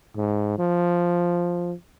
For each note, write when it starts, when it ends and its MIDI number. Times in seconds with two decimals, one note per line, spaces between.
0.16 0.56 44
0.59 1.72 53